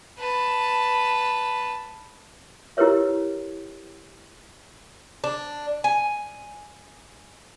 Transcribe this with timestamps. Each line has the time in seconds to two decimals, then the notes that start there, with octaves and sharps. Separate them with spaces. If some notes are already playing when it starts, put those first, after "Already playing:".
0.18 B4 A5
2.77 E4 G4 A#4 B4 C#5 E5
5.24 D4
5.84 G#5